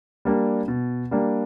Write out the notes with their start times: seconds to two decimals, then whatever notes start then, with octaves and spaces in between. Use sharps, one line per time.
0.25 G3 A#3 D4
0.68 B2
1.11 G3 A#3 D4